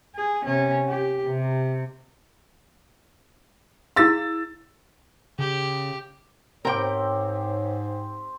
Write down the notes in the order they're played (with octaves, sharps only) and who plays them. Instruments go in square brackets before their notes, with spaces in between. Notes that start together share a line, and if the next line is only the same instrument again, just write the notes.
[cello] G#4
C3 C#4
G4
C3
[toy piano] E4 G#4 F5 [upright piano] E6 A6
[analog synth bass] C#3 [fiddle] G4
[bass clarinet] G#2 [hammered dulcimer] C4 G4 [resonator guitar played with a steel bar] A#4 G5 [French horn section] C#5